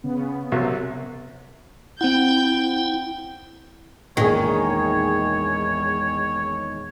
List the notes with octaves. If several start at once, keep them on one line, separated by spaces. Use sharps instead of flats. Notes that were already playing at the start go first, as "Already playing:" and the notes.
C#3 B3
C2 C3 F#3
C4 E4 F#5 G5 G6
A#1 E2 D#3 G#3 G#4 C#5